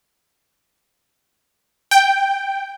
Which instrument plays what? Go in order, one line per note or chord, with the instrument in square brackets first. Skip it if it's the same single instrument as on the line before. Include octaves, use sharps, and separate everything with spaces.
[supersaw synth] G5